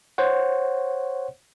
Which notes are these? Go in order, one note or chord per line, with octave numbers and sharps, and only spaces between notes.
C5 C#5 F#5